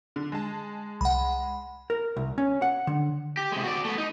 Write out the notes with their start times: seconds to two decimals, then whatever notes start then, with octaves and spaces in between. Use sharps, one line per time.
0.16 D3
0.32 G#3 A5
1.01 C2 F#5 B5
1.90 A#4
2.16 C2
2.38 C#4
2.62 F#5
2.87 D3
3.37 G4
3.52 C3 G#3
3.63 F#4 D5
3.85 A3 B3
3.98 D#4